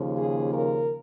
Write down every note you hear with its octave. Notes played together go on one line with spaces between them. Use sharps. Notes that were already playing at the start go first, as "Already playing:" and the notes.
Already playing: D#2 C#3 F3
G#4
A#4